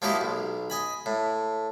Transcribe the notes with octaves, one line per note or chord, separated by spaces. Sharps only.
F3 F#3 A#3 E4 G4 D#5
B1
D#5 G#5 B5
A2